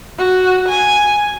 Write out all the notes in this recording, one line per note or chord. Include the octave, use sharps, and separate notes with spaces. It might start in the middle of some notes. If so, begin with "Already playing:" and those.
F#4
G#5